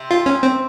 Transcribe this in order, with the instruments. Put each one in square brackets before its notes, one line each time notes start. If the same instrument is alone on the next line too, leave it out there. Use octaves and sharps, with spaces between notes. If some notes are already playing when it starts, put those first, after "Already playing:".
Already playing: [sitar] C3
[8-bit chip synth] F4
C#4
C4